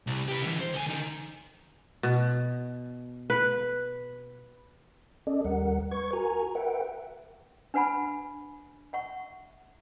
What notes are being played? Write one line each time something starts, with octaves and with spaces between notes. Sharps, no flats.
C2
G4 B4
D3 E3
C5
D2 G#5
D3 D#4
B2
B4
C#4 A4 D5 D#5
D#2 G3 A#4 F#5
B4 C#6 G#6
F#4 A#4 G#5 A#5
A#4 B4 E5 F#5 G5
D4 B4 F#5 G#5 B5
E5 F#5 C#6